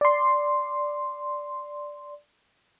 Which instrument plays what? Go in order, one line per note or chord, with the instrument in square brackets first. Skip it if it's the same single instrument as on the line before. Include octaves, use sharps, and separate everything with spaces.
[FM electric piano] D5 C6